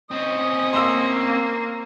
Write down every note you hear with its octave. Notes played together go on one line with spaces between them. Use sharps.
C4 C#4 D#5 D#6
A#3 C6 E6